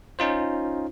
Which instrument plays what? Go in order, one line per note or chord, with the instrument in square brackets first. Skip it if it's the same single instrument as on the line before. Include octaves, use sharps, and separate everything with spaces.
[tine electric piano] C#4 D#4 F4 C5